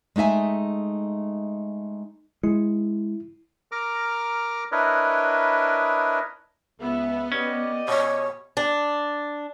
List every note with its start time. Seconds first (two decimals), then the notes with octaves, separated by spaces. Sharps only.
0.16 G#3 A3 D#4 E5 G#5
2.44 G#3 E4
3.72 A#4 A#5 D6 F6
4.72 D4 E4 A#4 B4 C#5 D#5
6.80 C#2 B3 E5
7.32 C#4 G4 D5 D#5
7.88 B2 C#5
8.57 D4